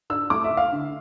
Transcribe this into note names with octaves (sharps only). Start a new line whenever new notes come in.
D4 E6
A3 D6
E5
A3
F5
D3